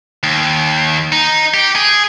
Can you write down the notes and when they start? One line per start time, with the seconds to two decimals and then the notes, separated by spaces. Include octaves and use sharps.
0.23 D#2
1.12 D#4
1.54 G4
1.76 G#4